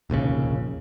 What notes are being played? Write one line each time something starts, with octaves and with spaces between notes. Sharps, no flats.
F1 A#1 D#2 C#3